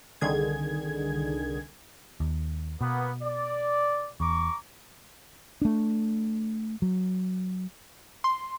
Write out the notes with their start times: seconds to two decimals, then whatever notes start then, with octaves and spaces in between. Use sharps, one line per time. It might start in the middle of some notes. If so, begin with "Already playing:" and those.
0.21 C2 D3 D#3 G#4 G#6
2.20 D#2
2.81 B2 A#3 B3
3.22 D5
4.20 E2 A#5 C#6 D6
5.62 A3 D4
6.82 F#3
8.24 C6